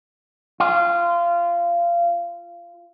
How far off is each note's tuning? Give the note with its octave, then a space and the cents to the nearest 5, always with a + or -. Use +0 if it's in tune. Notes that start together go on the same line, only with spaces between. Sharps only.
F4 -20